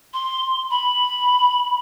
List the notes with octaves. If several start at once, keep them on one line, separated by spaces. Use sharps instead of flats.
C6
B5